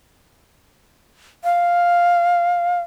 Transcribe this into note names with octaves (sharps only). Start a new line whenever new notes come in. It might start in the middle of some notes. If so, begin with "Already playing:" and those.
F5